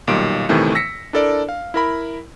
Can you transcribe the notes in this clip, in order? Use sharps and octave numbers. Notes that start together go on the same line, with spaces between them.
B1 A#2 D#3 G3 D7
G1 A2 C3 D#3 E3 A3
E6 A#6 B6 C#7
D4 E4 A4 A#4 D5
F5
E4 A#4 B5